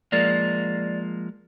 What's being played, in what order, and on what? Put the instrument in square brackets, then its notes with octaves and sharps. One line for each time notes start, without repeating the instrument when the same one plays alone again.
[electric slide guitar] F3 G#3 A#3 [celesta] D5 A6